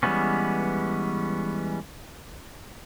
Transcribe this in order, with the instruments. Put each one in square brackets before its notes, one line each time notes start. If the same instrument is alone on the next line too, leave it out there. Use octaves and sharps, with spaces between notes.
[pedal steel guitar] E3 G3 G#3 B3 C#4